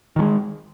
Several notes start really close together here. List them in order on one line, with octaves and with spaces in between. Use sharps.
D#3 F3 G#3